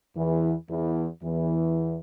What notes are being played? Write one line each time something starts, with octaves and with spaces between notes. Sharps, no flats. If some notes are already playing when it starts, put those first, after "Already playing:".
E2 E3
E2 E3
E2 E3